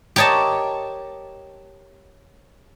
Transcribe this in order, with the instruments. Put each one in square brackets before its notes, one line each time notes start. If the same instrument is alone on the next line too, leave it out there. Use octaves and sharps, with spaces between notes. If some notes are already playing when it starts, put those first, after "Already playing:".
[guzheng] G4 A#4 C#5 D#5 A5